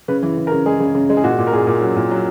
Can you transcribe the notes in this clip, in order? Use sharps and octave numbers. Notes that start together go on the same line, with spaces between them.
C#3 B4
E3
C#3
A#4
C#3
G#3 G#4
C#3
C#3
G#3
G#4
A#2 F#4
A#2
A#4
A#2 G#4
A#2
F#3
A#2
F#3